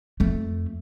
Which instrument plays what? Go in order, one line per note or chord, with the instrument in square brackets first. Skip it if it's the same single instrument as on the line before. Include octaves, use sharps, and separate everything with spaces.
[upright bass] F2 A3